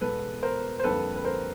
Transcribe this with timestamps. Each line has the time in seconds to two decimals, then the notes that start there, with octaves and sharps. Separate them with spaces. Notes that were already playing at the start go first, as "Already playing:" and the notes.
0.01 E2 B2 G#3 A4 B4
0.43 A#4 C5
0.79 C5
0.84 F2 D3 G3 A#3 A4 B4
1.16 B4
1.25 A#4 C5